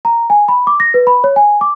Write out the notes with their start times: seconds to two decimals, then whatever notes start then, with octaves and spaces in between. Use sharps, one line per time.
0.05 A#5
0.30 G#5
0.48 B5
0.67 D6
0.80 A#6
0.94 B4
1.07 B5
1.24 C#5
1.36 G#5
1.61 D6